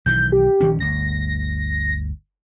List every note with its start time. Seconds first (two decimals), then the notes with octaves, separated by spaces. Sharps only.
0.06 B1 D#3 E3 G6
0.32 G4
0.61 A#1 D#3 C#4
0.80 G1 D2 A#6